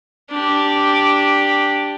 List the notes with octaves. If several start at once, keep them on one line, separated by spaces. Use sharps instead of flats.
D4 G4